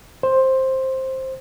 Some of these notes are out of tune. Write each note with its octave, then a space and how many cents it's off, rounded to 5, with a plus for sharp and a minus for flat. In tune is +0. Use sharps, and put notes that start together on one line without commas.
C5 +10